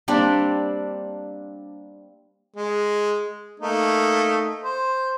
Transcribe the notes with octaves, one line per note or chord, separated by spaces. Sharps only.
G3 A#3 C4 D4
G#3
A3 A#3 D#4
C5